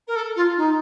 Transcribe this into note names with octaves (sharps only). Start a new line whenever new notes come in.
A#4
A4
F4
D#4